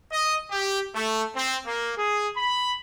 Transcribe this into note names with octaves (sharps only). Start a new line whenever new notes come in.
D#5
G4
A3
C4
A#3
G#4
B5